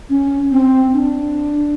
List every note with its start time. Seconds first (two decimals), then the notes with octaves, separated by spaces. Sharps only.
0.10 C#4
0.51 C4
0.93 D4